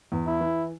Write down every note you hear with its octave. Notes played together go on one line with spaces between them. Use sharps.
E2
E4
E3